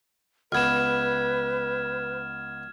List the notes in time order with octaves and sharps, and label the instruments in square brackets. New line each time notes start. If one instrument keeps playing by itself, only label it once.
[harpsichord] C#2 B3 [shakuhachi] B4 [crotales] F6 G#6 E7